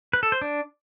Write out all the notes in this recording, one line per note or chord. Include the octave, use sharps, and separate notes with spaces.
B4
A4
C5
D4